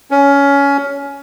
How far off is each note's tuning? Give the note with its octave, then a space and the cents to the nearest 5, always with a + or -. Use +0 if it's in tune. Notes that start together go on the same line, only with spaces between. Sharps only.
C#4 +20